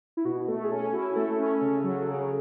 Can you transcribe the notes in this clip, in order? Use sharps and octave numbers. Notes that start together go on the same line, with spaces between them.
E4
B2 F#4
A3 A4
G#4
C#4 A4
E4 F#4
A3 A4
C#4
C#3
F#3
C#3